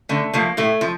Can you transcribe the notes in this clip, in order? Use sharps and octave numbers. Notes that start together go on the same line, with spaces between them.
D3 A3
F3 A3 A#3
A2 A3
F3